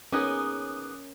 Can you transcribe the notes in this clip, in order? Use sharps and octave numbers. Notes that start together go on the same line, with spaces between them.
B3 C#4 D#4 G#4 A#4 D6 D#6 F#6